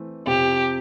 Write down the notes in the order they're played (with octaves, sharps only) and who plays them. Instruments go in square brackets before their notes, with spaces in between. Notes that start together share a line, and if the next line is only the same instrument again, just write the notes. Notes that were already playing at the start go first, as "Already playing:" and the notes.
Already playing: [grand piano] E3 A3 C4
[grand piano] F2 C3 F3 C4 [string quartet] G4